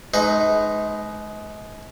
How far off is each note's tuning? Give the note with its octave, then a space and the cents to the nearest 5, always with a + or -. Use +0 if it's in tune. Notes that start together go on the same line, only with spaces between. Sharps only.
G#3 +35 D#4 +0 B4 +30